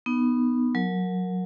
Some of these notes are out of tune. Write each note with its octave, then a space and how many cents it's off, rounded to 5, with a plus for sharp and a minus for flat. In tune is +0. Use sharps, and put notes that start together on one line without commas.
B3 +0 D#4 -15
F#3 -15 A#4 -5